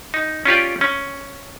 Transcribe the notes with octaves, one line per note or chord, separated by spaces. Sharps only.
D#4
C#4 F4 G4 D5
C#4